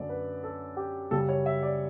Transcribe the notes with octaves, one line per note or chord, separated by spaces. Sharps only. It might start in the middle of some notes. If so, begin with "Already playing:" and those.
Already playing: F#2 D3 A3 D5
B4
A4
G4
F#2 C#3 G3 A4
C#5
E5
D5